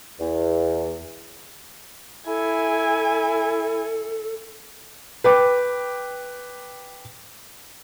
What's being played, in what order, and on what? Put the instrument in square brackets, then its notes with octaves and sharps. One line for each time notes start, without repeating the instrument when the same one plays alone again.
[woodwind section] E2
[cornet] E4 [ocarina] A4 [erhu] G#5
[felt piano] B4 G5 D6